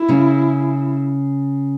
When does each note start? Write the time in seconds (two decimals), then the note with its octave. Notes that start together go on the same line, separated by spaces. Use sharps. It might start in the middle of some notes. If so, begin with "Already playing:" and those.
Already playing: E4
0.08 C#3 C#4